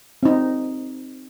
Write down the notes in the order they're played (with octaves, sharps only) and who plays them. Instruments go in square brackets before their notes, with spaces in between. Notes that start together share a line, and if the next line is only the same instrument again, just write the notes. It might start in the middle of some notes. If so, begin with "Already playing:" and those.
[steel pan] C4 D#4